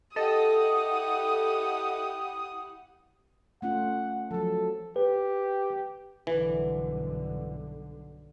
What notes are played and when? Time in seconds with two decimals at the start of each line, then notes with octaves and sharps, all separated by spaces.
0.16 E4 G4 A4 D#5 F#5 D#6
3.62 A3 C#4 F4 F#5
4.31 F3 F#3 A4
4.96 G4 B4
6.27 B1 G2 D3 E3